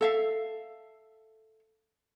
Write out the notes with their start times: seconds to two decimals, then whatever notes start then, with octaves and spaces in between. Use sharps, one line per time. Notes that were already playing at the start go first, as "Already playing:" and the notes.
0.01 A4 E5 F5